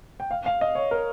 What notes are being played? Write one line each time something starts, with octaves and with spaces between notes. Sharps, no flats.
G5
F5
F5
D#5
C#5
A#4